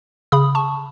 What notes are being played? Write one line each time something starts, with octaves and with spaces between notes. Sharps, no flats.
C#3 B5 D#6
A5 C#6